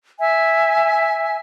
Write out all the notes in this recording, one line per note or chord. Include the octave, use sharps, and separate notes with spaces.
E5 G#5